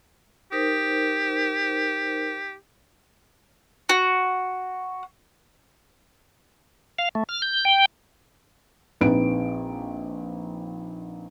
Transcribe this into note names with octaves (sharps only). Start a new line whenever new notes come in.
D#4 G4 A#4 C5
F#4
F5
A3
F6
G6
G5
A#1 C4 D#4 B4 D7